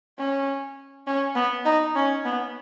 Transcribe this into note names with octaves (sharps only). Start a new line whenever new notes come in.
C#4
C#4
B3
D#4
C#4
B3